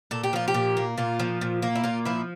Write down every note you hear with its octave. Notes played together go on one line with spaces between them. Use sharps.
A#2 A4
G4
F3 F4
G4
A#2
A#3
A#2 F4
F3
A#2
A#3
E4
A#2 F4
F3 E4